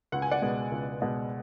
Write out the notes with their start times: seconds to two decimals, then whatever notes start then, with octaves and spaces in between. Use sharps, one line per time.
0.12 C#2 F#5
0.22 G#5
0.31 D5 F#5
0.42 B2 G#3 B3
0.72 C#2
1.02 B2 G#3 B3